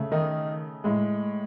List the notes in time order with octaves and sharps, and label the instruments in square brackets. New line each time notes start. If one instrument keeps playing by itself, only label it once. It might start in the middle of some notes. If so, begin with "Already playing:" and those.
Already playing: [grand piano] C#3 A3
D#3 D#4
A2 G#3